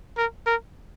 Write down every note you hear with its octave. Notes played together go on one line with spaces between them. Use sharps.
A#4
A#4